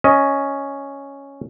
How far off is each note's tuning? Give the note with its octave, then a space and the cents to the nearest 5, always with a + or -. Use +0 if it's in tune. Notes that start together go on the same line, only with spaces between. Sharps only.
C#4 +0 D#5 +10